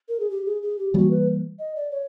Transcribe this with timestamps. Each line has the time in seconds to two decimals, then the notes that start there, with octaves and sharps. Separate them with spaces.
0.08 A#4
0.20 G#4
0.30 G4
0.45 G#4
0.62 G#4
0.79 G4
0.94 E3 G3 A#3 F#4
1.10 B4
1.59 D#5
1.75 D5
1.91 C#5